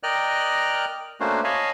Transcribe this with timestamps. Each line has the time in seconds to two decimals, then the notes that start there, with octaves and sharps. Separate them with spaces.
0.03 A#4 D5 D#5 G5 F6 F#6
1.20 A3 A#3 C#4 D4 F#4 C5
1.44 C#5 D#5 F5 G#5 A5 B5